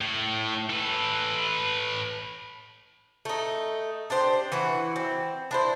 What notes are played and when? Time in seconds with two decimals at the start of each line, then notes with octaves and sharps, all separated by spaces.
0.01 A2
0.70 A4 B4
3.25 A3 D#4
4.10 D4 G4 C5
4.52 E3 E4 F#4
4.96 C4
5.51 D4 E4 C5